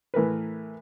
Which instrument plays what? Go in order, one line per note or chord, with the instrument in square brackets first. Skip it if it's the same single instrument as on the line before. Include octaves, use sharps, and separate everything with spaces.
[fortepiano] A2 E3 A#4 B4